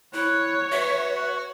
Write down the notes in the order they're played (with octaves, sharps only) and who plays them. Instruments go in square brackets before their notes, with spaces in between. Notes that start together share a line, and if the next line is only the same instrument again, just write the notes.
[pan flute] E4 [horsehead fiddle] C#5 [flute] F#6
[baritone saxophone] F#4 [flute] B4 [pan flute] E5